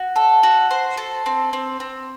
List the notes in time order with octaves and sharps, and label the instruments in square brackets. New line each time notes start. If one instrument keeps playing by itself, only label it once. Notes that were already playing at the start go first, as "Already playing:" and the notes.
Already playing: [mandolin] F#4
A4
F#4
C5
A4
C4
C4
C4